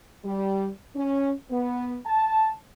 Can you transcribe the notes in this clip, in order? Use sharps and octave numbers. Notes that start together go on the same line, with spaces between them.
G3
C#4
B3
A5